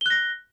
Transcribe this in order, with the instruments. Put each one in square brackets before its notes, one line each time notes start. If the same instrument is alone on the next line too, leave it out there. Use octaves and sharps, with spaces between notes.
[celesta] G7
F#6
A#6